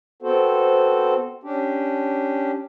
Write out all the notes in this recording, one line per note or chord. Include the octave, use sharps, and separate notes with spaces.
B3 C4 F#4 A4 C5
C#4 D4 G4